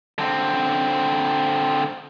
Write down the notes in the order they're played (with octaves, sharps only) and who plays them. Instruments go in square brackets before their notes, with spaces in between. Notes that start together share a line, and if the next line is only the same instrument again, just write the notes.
[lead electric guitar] D3 C4